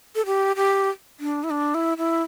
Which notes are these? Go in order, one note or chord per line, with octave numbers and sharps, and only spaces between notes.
A4
G4
G4
D4
E4
D4
E4
E4